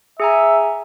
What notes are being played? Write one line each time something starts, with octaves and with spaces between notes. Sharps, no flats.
G#4 E5 G#5 A#5